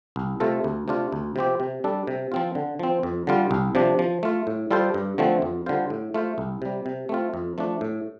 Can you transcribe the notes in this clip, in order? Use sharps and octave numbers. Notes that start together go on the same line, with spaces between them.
C2
C3 A3 F4 A4
D2
C3 A3 D4 F4
D2
C3 F3 C4 G4
C3
G3 D4 A4
C3
F3 C4 F4
D3
F3 C4
F2
D3 G3 F4
C2
C3 F3 D4
F3
A3 F4
A2
G3 F4 A4 C5
G2
D3 F3 A3 C4
F2
D3 G3 F4 C5
A2
A3 F4 C5
C2
C3 G3
C3
A3 C4 F4
F2
F3 A3 D4
A2